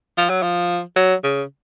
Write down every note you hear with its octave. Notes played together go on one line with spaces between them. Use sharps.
F3
F#3
F3
F#3
C#3